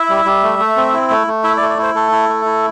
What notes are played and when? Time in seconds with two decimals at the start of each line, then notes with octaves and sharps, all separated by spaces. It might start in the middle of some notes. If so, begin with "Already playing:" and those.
Already playing: E4 E5
0.09 G3
0.25 G3
0.43 A3
0.59 A3
0.77 C4
0.93 E4
1.10 A3
1.27 A3
1.44 E4 E5
1.57 D5
1.61 A3
1.69 D5
1.78 E4 C5
1.95 A3 A4
2.12 E4
2.29 A3
2.46 E4